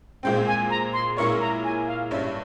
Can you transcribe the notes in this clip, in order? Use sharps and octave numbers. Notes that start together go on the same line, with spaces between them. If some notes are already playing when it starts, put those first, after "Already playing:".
A#2 G#3 C4 G5
G#5
A#5
C6
A#2 G#3 E4 A#4 C#5 C#6
A#5
G#5
F5
G2 G3 C#4 E5